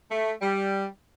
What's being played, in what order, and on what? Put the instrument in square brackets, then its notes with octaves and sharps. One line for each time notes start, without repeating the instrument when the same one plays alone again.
[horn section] A3
G3